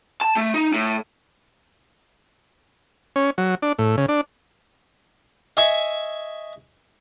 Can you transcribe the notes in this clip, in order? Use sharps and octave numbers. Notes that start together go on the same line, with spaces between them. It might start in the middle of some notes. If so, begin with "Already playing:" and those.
A5
A3
D#4
A2
C#4
F#3
D4
A2
C#3
D4
D#5 E5 G#5 C#6